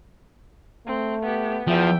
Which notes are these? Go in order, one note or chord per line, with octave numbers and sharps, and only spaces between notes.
A3 C4
B3 G4
E2 F3 E5 G5